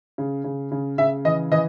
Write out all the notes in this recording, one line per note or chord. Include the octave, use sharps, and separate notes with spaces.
C#3
C#3
C#3
C#3 E5
E3 D#5
E3 D#5